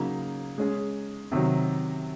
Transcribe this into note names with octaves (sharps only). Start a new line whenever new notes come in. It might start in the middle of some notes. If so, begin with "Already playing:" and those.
Already playing: C#3 F#3 A#3 D#4
G#3 C#4 G#4
C3 D#3 F#3